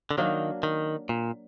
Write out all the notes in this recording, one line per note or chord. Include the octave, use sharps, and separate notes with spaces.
D3
D#3 F#3 A#3 D4
D#3
A#2